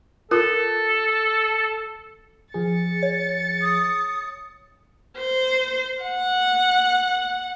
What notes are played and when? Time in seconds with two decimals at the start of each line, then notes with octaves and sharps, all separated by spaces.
0.31 F4 A4 A#4
2.54 F3 G#4 A6 C#7
3.03 C#5
3.62 D#6
5.19 C5
6.03 F#5